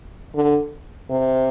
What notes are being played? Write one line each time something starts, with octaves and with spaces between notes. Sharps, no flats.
D3
C3